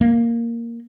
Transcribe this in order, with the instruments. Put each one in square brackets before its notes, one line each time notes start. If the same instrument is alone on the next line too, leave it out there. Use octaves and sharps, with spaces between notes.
[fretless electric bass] A#3